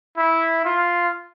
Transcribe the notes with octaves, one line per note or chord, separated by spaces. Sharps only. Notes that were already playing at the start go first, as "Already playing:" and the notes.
E4
F4